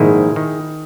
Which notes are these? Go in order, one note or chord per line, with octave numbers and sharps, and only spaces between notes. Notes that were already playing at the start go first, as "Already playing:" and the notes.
Already playing: A#1 G#2 D#3 E4 G#4
D#3